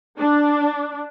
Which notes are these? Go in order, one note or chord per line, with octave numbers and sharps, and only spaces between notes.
D4